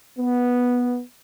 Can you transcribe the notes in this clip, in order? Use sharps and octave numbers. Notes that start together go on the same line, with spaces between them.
B3